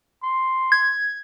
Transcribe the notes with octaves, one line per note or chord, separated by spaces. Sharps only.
C6
G#6